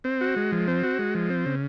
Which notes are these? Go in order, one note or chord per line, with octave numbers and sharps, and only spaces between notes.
C4
F#4
G#3
F3
C4
F#4
G#3
F3
C4
C#3